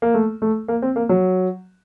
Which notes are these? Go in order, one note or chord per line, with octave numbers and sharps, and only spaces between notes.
A#3
A3
A3
A#3
C4
A#3
F#3